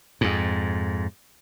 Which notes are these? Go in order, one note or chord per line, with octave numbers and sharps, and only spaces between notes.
F2 G#2